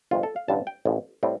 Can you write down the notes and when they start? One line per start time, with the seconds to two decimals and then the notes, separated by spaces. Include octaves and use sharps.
0.11 G1 F2 C3 F4
0.23 A4
0.36 F5
0.48 A1 G2 D3 A5
0.67 G5
0.85 A1 A2 F3
1.23 A2 G3 C4